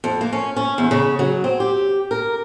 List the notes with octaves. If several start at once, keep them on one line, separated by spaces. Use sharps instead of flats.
F2
A#3
C#4
C#4
E2
C#3
F#3
C4
G4
A#4